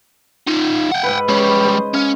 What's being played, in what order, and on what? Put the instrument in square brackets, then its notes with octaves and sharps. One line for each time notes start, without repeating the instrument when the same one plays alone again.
[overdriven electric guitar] D#4 F4
F#5 G5
[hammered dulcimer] G#2 B4
[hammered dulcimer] C#3 B5 [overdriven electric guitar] G3 G#3
[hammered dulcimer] C5 D#5
[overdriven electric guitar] C#4 [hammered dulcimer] F5